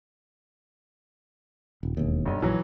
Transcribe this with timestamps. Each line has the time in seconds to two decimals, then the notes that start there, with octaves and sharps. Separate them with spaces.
1.83 D#1
1.97 E1 D#2
2.26 B1 G2
2.42 A#1 E3 F#3